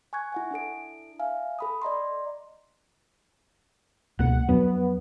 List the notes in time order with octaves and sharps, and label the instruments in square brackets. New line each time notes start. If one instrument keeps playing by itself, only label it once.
[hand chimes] G#5 C#6 F#6 G#6
E4 F#5 G#5
D4 E4 A4 D7
E5 F5 G#5
A4 B5 D#6
D5 D#5 A#5 C6
[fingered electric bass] C#2 B2 A#3 [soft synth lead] F#5
[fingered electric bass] F2 F#3 D4 [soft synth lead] B3